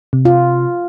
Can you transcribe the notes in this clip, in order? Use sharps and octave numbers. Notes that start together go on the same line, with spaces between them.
C3
F4